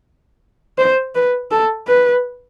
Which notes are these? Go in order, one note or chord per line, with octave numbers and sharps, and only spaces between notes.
C5
B4
A4
B4